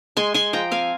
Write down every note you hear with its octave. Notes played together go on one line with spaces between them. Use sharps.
G#3 G#5 C6
G#3 G#5 C6
F3 G5 A#5
C4 F5 G#5